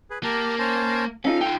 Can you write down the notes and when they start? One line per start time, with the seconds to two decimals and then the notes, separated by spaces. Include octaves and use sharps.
0.10 G#4 B4
0.23 A#3 G4 A#4 A5
0.59 C#4 C5 A5
1.25 C#4 D#4 F4 A4 F5
1.41 D#4 F4 G5